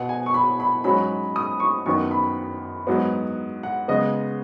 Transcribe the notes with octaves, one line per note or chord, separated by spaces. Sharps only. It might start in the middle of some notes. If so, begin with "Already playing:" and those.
Already playing: B2 B3 F#5
G#5
C#6
B5
B5
G#2 F#3 C#4 B5
D#6
C#6
F#2 D#3 B3 C#6
B5
G#2 F#3 B3
F#5
C#3 G#3 B3 D#5